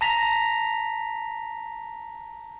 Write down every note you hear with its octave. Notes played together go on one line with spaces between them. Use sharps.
A5 A#5 A#6 B6 F7